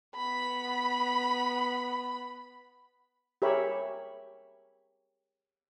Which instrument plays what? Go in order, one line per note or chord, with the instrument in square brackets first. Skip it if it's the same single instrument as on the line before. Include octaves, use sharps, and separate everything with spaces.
[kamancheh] B3 B5
[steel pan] G4 G#4 A#4 C#5 E5 B5